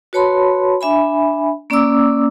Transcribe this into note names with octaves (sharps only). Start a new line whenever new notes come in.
F#4 B4 C#5 A5 B5 C6
D4 E5 G#5 B5
A#3 C#4 D5 A#5 D6 E6